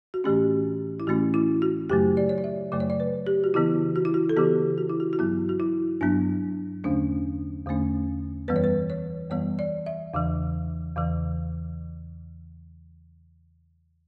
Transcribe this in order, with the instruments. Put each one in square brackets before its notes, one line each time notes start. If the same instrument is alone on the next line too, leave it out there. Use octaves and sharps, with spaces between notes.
[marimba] F#4
A2 E3 A3 C#4 G4
E4
A2 E3 A3 C#4 F#4
E4
F#4
F#2 C#3 F#3 A3 G4
D5
C#5
D5
E5
F#2 C#3 F#3 A3 D5
C#5
D5
B4
G4
F#4
C#3 E3 B3 E4
F#4
E4
F#4
A4
C#3 E3 B3 G4
F#4
E4
F#4
F#4
G2 F#3 B3 E4
F#4
E4
G2 F#3 B3 D4
E2 D3 A3 C#4 D4
E2 D3 A3 C#4
F#2 E3 G3 B3 B4
C#5
B4
C#5
F#2 E3 G3 B3 C#5
D5
E5
E2 C#3 E3
E2 C#3 E3